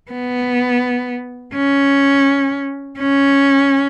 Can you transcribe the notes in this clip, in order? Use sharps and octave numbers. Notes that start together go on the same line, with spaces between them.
B3
C#4
C#4